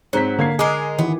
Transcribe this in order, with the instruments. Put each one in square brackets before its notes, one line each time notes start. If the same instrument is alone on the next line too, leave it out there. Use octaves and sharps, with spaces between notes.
[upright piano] G#2 C4 B6 [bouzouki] F#3
[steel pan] D3 [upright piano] A#3 G#6 C7
[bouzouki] G#3 A#4 [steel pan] G#4 [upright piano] D6
[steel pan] D#3 E3 [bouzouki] B3